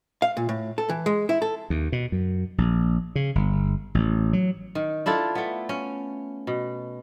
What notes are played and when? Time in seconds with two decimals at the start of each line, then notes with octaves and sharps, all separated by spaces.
0.22 F5
0.37 A#2
0.49 A2
0.78 A4
0.89 E3
1.06 G#3
1.29 E4
1.42 A4
1.70 D#2
1.92 B2
2.12 F#2
2.58 A#1
3.16 C#3
3.35 G1
3.95 A1
4.33 F#3
4.75 D#3
5.06 D4 E4 F4 A4
5.35 A3 B3
5.69 C#4
6.47 B2